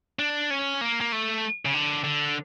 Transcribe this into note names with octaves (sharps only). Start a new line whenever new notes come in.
D4
C#4
A#3
A#3
A3
C#3
D3
D3